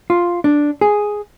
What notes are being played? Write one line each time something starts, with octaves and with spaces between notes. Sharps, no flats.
F4
D4
G#4